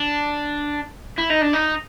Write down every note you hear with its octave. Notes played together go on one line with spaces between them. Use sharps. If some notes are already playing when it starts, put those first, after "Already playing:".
Already playing: D4
E4
D#4
D4
D#4